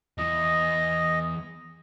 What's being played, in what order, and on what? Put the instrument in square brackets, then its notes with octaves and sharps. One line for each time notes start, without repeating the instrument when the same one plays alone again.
[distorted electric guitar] E2 E3 [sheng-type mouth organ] D#5